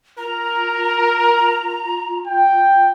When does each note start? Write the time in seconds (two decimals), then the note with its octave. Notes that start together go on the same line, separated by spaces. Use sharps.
0.18 F4 A#4 A#5
2.27 G5